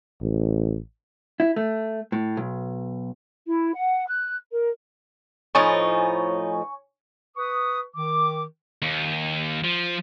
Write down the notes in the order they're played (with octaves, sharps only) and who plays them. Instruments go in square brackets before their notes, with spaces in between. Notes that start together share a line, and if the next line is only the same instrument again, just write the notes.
[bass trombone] A1
[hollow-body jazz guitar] E4
A3
A2
B1
[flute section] E4
F#5
F#6
A#4
[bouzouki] A2 F3 D#4 [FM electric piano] C#5 G#5 C#6
[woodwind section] B4 C#6 D#6
D#3 D6
[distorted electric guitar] D#2
F3